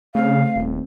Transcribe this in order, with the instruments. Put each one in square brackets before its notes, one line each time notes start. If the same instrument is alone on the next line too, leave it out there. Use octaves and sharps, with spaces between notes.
[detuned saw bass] C#3 [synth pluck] A3 C4 [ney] F5
[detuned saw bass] D#1